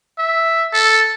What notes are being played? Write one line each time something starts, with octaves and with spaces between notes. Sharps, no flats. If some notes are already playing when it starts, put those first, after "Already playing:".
E5
A4